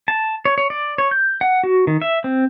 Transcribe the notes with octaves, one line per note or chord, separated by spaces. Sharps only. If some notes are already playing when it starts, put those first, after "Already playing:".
A5
C#5
C#5
D5
C#5
G6
F#5
F#4
D#3
E5
C4